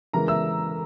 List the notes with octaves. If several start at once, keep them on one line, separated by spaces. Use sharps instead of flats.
C#3 E3 G#3 A#4 A#5
E5 E6